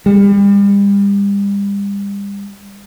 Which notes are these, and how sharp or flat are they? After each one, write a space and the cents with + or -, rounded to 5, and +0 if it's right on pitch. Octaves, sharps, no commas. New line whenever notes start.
G3 +35